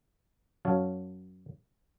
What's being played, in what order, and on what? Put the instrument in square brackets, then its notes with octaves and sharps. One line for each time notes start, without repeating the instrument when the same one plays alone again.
[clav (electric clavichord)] F#2 F#3 C#5 F5 A5